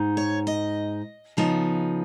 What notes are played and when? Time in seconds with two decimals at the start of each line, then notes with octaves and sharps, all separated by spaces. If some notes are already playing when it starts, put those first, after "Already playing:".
Already playing: G#2 D#4
0.17 C#5
0.47 D#5
1.37 C#3 F3 B3 D#4